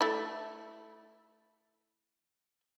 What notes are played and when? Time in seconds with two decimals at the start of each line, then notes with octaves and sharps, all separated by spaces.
0.01 A3 E4